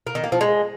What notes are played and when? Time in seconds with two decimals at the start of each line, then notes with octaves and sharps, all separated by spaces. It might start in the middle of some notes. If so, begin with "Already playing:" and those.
0.07 A#3
0.15 D#3
0.24 A#3
0.32 F3
0.41 G#3